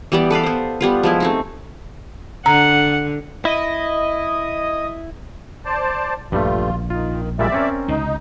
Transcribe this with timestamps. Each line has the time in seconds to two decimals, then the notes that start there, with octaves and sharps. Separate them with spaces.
0.12 E3 G3 B3 D5
0.30 A4 B4 D5 F5
0.43 B3 C5
0.81 G3 B3 F4
1.03 F3 G#3 E4
1.20 A3 C4 D#4
2.46 D3 F#5 A#5
3.45 E4 D#5
5.65 C5 D5 A5
6.32 A#1 G2 G3 A3 F4
6.90 D#3 F4
7.39 A#2 G3 G#3 D5 E5
7.52 C4 C#4 A#4
7.88 C#2 C3 D#4